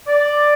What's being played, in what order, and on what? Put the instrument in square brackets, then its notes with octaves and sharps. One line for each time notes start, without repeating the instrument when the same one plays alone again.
[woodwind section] D5